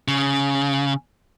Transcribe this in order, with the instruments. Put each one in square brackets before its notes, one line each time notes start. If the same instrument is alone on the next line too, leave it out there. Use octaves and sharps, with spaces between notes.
[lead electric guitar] C#3